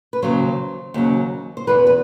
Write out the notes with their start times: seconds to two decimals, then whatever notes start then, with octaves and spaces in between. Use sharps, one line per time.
0.13 B4
0.22 D#2 C#3 F#3 C5
0.94 D#2 C#3 F#3
1.57 C5
1.67 E2 C#3 E3 B4
1.87 B4